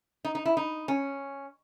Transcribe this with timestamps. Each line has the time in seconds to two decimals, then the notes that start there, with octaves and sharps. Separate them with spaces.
0.25 D#4
0.35 D#4
0.46 E4
0.57 D#4
0.88 C#4